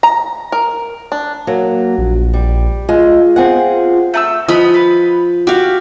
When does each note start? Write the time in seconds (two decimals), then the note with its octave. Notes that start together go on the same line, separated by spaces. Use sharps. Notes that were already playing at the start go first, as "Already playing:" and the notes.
0.03 A#5
0.52 A#4
1.12 D4
1.47 F#3 A#3
1.98 A#1
2.34 G3
2.89 G#3 F4
3.36 C4 G#4 F#5
4.14 A3 A5 E6
4.48 F3 B3 C#4 D#5 B5
4.74 B4
5.47 F#4 G4 F5